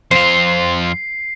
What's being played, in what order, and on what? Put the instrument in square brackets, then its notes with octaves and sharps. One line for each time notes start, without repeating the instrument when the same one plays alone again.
[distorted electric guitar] F2 F4 [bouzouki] C5 [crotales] C7